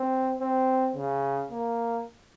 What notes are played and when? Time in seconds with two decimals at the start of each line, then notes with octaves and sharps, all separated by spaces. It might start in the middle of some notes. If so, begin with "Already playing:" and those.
Already playing: C4
0.40 C4
0.96 C#3
1.51 A#3